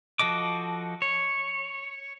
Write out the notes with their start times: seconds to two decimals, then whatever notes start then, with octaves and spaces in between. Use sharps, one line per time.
0.19 F3 F#4 A4 D#5 D6
1.02 C#5